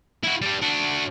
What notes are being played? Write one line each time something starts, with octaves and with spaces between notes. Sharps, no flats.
E4 F#4
G3 D4
D4 F#4